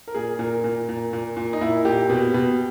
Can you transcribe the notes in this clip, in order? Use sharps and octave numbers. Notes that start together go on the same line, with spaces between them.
A#4
A#2 G#4
A#2 A#4
A#2
A#2
A#2
A#2
D#4
A#2 E4
A#2 G4
B2
B2